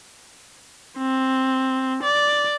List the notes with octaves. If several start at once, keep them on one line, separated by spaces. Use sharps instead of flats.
C4
D5